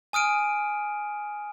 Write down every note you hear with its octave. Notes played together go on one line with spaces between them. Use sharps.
G#5 D#6 F6 D7 D#7